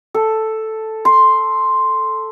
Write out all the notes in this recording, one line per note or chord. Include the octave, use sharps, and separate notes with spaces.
A4
C6